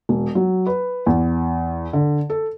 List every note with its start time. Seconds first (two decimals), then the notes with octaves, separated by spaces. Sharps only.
0.09 E1
0.35 F#3
0.67 B4
1.06 E2
1.93 D3
2.30 A4